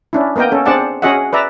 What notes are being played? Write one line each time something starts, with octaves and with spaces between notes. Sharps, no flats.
C#4 D4 E4
A#3 B3 A#4 D#5 G5
C#4 A4
C4 D4 G#4 D5 F#5 A5
C#4 F#4 G#4 D#5 E5 F#5
B4 D5 E5 A#5